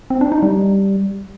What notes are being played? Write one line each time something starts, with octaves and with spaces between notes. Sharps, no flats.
C4
D4
D#4
G3